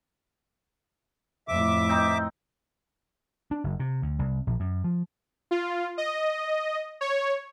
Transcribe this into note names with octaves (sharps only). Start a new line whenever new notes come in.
F2 A2 E5 D6
C4 D#4
D4
F#1
C3
D2
C2
A#1
F#2
F3
F4
D#5
C#5